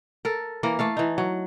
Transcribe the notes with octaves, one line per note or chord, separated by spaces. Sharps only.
A4 A#4
E3 A#3 A#4
A3 A4 F5
E3 D#4
F#3